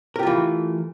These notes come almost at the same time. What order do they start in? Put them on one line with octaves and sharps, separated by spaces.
A#4 G4 F4 E3 A3